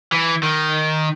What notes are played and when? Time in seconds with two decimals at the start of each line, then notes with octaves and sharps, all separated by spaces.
0.12 E3
0.43 D#3